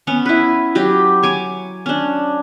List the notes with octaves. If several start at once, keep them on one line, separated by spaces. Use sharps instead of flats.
B3 C#4 C#5
E4 B4
F#3 G4 G5
C#5 G#5 D6
C#4 D4